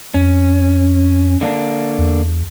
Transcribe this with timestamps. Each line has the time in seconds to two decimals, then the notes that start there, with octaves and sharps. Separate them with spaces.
0.14 F2 C#4
1.41 D3 A#3 D4
1.98 E2